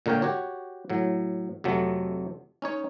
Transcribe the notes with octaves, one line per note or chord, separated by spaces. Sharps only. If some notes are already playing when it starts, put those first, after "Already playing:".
A#2 D3 A#4 C#5 G5
F#4 G4 C#5
A2 F#3
F2 C3 F#3 A3
C#4 D#4 C#5